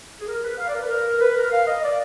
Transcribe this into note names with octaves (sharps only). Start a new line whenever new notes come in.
G#4
A#4
B4
F5
D5
A#4
B4
A#4
B4
A#4
F5
D#5
D5